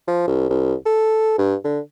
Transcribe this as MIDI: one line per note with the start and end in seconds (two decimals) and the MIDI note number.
0.08 0.24 53
0.28 0.45 36
0.49 0.74 36
0.86 1.36 69
1.38 1.55 43
1.65 1.80 50